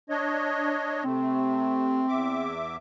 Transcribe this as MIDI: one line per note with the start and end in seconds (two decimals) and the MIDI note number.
0.10 1.04 62
0.10 1.04 73
0.10 1.04 75
1.05 2.06 48
1.05 2.06 57
1.05 2.54 60
2.08 2.76 40
2.08 2.76 76
2.08 2.76 86